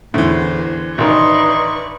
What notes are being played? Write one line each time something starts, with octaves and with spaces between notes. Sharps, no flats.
E2 A2 D3 E3 C5
A1 D#3 D#4 B4 D5 C6 C#6